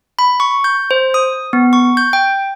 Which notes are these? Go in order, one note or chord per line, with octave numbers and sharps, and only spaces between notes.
B5
C#6
G6
C5
D#6
B3
C#6
G6
G5